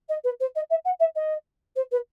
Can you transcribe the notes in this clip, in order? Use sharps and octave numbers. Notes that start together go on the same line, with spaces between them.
D#5
B4
C5
D#5
E5
F#5
E5
D#5
C5
B4